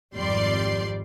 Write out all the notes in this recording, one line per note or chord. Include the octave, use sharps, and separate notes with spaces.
G#1 F2 G3 D5 C6